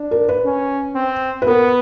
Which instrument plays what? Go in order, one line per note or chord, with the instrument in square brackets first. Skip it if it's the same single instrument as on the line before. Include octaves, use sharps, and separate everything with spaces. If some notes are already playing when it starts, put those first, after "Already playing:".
Already playing: [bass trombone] D4
[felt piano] A#4
B4
[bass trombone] C#4
C4
[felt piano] B4
[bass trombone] B3 [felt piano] A#4